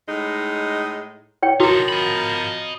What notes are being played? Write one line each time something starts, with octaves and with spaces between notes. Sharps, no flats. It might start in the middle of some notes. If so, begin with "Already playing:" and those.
A2 G#3 D#4
C#5 G5
F3 D#4 F#4 A4 A#4
D#5 B5